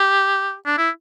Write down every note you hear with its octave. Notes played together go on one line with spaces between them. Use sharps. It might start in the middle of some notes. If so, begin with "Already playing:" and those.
Already playing: G4
D4
E4